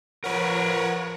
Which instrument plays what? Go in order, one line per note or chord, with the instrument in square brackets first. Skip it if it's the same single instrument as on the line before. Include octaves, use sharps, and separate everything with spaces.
[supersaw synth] F3 C#5 F#5 [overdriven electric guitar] A#4 B4